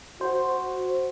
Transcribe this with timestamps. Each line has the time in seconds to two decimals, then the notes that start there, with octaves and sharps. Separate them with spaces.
0.21 F#4 C5